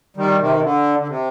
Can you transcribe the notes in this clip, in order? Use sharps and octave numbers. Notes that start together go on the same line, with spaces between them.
D#3 G3
C3 D#3
C3
D3
D3
C3